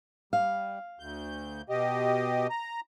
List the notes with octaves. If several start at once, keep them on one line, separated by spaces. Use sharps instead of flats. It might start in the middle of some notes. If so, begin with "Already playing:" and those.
G3 F5
D2 G6
B2 G4 D#5
A#5